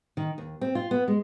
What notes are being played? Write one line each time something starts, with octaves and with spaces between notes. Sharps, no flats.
D#3
D#2
C4
F4
B3
G#3